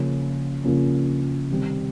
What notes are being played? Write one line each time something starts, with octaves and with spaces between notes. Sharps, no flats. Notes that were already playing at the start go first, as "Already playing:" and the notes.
Already playing: C#3 F3 A#3 C#4 F4
C#3 F3 A#3 C#4 F4
C3 D#3 G3 C4